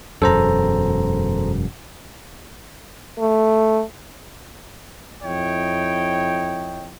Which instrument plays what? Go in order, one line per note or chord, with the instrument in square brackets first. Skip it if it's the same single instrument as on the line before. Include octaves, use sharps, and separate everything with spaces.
[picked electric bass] E1 F#2 [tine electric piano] A4 C5 A#5
[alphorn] A3
[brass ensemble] F2 E4 C#5 D#5 G5